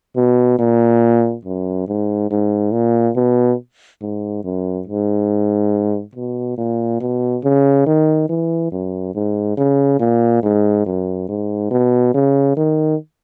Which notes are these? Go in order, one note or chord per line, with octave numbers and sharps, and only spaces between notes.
B2
A#2
F#2
G#2
G#2
A#2
B2
G#2
F#2
G#2
B2
A#2
B2
C#3
D#3
E3
F#2
G#2
C#3
A#2
G#2
F#2
G#2
B2
C#3
D#3